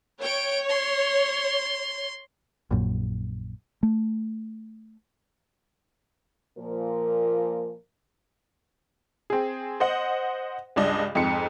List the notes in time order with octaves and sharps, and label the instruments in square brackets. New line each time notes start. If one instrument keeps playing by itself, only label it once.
[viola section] C#5 [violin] G5 D7
[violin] C6
[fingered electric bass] A#1 F#2 A#2
A3
[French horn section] A#2 F3 A#4
[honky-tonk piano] C4 G#4
C5 D#5 F#5
C#2 G2 D4 D#5
F2 G#2 G#3 C#7